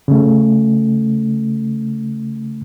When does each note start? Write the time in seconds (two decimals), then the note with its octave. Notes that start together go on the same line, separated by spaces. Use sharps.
0.08 C#3 A3